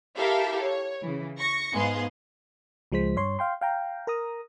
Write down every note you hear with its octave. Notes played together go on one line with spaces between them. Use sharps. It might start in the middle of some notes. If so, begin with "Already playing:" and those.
E4 G4 A4 A#4 E5 F5
C#5
C#3 E3
C#6 A#6 C#7
G#2 B3 G#4 F5 C6
C#2 F3 G#3 C5 B6
G2 C#5 C6
F5 G5 C6
F5 G5 A#5
A#4 A#5 D#6